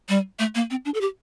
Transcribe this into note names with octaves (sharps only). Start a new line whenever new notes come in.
G3
A3
A#3
C4
D4
A4
G4